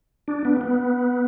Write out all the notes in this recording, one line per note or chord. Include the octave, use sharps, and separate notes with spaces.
D4
B3
B3